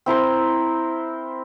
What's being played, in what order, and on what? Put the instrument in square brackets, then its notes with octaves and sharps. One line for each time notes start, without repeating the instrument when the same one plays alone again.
[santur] C4 E4 A#4 C5